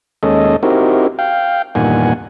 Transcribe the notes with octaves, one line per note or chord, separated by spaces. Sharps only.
D#2 G#3 C#4 A4 D#5
C4 D#4 E4 F#4 G4 A#4
F5 G5
E2 G2 A#2 D#3 F#5 G#5